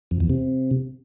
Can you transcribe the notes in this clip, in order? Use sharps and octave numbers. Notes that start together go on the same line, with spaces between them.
F2
E2
C3